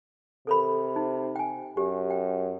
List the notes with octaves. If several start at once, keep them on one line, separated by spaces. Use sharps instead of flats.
C3 A4 A#4 B5
D#4
G5 G#5
F#2 G4
G5